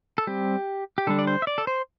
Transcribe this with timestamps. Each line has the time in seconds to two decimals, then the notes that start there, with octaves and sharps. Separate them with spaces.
0.18 A4
0.27 G3 C4 G4
0.98 G4
1.07 D3 G3 D4 A4
1.19 D5
1.27 C5
1.42 E5
1.47 D5
1.58 A4
1.67 C5